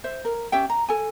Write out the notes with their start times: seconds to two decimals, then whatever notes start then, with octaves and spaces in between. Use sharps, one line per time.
0.04 C5 E5
0.25 A#4
0.52 C#4 G4 E5 G5
0.70 A#5
0.88 A4 G#5